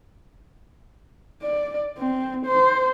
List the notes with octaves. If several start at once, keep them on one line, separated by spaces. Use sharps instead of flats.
D5
C4
C5